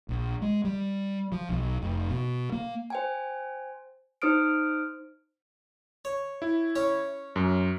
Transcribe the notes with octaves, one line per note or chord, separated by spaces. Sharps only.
A#1
G#3
G3
F3
B1
F1
B2
A#3
C5 G5 G#5
D#4 C5 D#6 F6 D7
C#5
E4
C#4 C#5
F#2